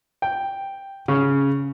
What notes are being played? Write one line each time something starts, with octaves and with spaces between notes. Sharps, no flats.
G5
C#3